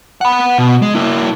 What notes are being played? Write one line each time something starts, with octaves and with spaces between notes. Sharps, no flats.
F#5 B5
B2
G#3
A#3 E4